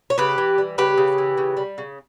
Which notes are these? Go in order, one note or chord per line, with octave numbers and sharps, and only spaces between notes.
C#5
C#3 G4 B4
E3
G3
C#3 G4 B4
C#3
E3
C#3
G3
C#3